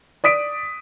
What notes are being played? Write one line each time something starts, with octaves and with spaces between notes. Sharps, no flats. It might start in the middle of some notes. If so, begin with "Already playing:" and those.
D5 D#6 B6 D7